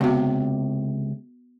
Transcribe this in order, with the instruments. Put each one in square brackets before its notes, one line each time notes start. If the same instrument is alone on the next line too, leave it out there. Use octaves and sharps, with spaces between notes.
[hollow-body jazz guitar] C#2 C3 [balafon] B3 F#4 F5